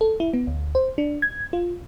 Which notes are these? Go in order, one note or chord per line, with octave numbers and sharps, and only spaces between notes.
A4
E4
B3
D2
C5
D4
G#6
F4